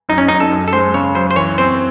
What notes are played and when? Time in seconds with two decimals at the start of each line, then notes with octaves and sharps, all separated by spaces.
0.09 F#2 D#4
0.18 C#4
0.28 F#2 D#4
0.40 A4
0.52 F#2
0.68 A4
0.73 G#3 C5
0.94 C#3 C#5
1.15 F#2 C5
1.31 C5
1.36 E3 C#5
1.58 C4 C5